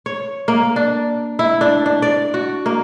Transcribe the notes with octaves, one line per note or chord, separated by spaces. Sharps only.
C#5
A#3
D4
E4
D4
D4
D5
F#4
A#3